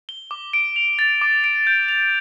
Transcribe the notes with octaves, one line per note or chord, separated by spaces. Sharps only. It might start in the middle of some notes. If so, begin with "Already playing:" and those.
G7
D6
D7
F7
A6
D6
D7
G6
F7